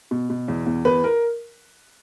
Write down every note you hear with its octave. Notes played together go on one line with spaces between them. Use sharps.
B2
B2
E2
E2
E2 B4
A#4